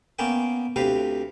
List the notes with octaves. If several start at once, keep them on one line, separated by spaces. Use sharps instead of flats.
A#3 B3 C#4 D5 G5
D2 C3 G4 B4 F5